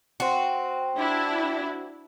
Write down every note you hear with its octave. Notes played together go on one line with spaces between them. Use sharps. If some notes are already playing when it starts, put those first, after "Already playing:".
C4 F#4
D4 E4